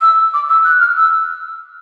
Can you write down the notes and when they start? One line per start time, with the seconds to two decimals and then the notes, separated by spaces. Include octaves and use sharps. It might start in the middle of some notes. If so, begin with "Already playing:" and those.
0.02 E6
0.34 D6
0.49 E6
0.64 F#6
0.80 F6
0.96 E6